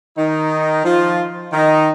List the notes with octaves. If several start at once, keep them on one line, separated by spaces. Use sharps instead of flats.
D#3 D#4
F3 F4
D#3 D#4